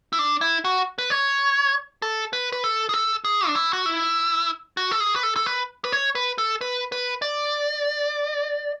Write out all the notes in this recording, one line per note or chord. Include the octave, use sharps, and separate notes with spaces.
E4
D4
E4
F#4
B4
C#5
A4
B4
B4
A4
G#4
A4
G#4
D4
E4
F#4
E4
F#4
A4
G#4
B4
A4
A4
B4
B4
C#5
B4
A4
B4
B4
D5